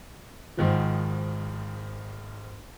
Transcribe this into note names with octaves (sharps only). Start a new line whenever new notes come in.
G#1 G#2 D#3 F3